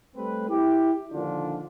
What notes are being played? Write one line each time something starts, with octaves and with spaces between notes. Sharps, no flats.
G3 A3 C4 B4
E4 G4
A#2 D3 D#3 F3 D4 F4